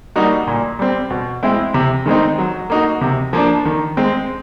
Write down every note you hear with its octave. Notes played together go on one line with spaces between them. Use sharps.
G3 A#3 D#4 F#4
A#2
G3 C4
B2
G#3 C4 E4
C3
D#3 G#3 C4 D#4
F#3
A#3 D#4 F#4
C3
F3 A#3 D4
D#3
G#3 C4